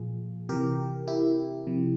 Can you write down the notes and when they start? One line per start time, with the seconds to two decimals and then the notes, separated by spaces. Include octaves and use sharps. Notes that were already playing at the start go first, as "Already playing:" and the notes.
Already playing: A#2 F3 F4 G#4
0.49 C3 E3 G4 A#4
1.08 E4 G4
1.67 C3 F3